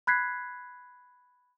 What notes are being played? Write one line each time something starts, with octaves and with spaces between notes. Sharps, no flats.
B5 F#6 G#6 B6 C7